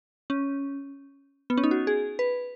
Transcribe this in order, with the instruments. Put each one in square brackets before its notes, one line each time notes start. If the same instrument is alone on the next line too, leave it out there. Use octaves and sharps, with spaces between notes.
[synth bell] C#4
B3
C#4
D#4
F#4
G#4
B4